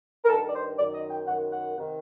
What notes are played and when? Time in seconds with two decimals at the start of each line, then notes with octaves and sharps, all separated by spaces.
0.24 A#4
0.28 D#3 A4
0.33 G2
0.47 D5
0.54 C5
0.77 F#2 D#3 D5
0.94 D#5
1.11 G5
1.27 F#2 D#3 F#5
1.52 F#5
1.77 C3 D#3